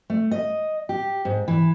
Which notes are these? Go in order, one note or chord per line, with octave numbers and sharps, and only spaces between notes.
A3
D#5
G4
G#2
E3